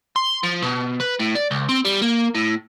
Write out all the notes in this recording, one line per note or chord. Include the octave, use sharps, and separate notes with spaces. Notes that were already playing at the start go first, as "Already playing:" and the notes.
C6
F3
B2
B4
A2
D5
C#2
C4
G3
A#3
A2